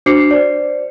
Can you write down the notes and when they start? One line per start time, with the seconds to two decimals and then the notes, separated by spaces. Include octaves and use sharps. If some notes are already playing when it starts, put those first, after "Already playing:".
0.06 D4 F#4 C5 D6 C7 C#7
0.31 C5 D5